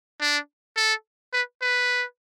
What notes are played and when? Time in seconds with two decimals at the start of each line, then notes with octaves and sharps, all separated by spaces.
0.21 D4
0.77 A4
1.33 B4
1.62 B4